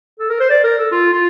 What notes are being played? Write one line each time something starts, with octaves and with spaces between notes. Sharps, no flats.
A4
A#4
C5
D5
A#4
A4
F4
F4